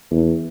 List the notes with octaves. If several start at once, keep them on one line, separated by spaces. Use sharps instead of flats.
E2